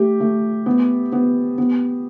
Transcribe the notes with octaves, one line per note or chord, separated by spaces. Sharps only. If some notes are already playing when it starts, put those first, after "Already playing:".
Already playing: A3 G4
A3
B3
B3
B3